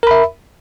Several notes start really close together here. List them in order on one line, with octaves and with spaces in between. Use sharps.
A#4 B5 E5